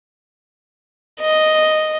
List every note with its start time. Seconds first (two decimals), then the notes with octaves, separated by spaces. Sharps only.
1.21 D#5